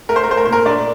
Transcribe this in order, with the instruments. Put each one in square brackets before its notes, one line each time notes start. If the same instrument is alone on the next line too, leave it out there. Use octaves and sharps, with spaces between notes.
[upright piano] A3 A#4
C5
A#4
A3 C5
A#4
A#2 C5
A#4
A3 D4 D5